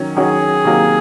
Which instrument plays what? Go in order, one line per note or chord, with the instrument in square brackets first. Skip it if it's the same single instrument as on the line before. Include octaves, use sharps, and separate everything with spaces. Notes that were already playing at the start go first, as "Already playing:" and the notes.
Already playing: [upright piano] D#3 F#3 C#4
[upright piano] D#3 F#3 C#4 F#4 [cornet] G#4
[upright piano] C3 D#3 F#3 A#3